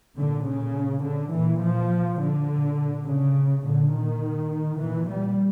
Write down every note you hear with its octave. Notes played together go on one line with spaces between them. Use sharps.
A#2 D3
C#3
D3
A#2 E3
F3
D3
A#2
C#3
A#2 D3
D#3
A#2 E3
G3